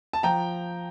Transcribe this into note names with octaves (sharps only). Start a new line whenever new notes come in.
A5
F3 G5 A#5